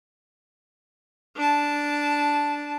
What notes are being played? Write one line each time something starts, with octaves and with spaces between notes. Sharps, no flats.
D4 A5